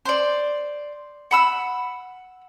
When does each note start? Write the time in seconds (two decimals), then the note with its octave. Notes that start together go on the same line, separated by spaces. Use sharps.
0.05 C5 D5
1.31 F#5 B5 E6